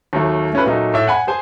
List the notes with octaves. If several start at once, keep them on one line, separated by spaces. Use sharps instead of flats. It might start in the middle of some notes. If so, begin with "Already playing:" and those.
D#2 F#3 A3
A3 C#4 F4 B4
A#2 F#3 A3 D#4
A2 E5
F#5 G#5 B5
G#4 C5 G#5